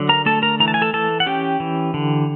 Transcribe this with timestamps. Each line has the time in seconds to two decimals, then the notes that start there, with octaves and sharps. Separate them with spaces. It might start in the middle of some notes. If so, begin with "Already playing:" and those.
Already playing: D3 F#3
0.09 A#4 A#5
0.26 A3 A4 A5
0.42 A#4 A#5
0.60 E3 A#5
0.68 A5
0.74 G#5
0.82 A4 A5
0.93 E3 A4 A5
1.20 F#5
1.26 C#4 G4 G5
1.60 E3
1.94 D3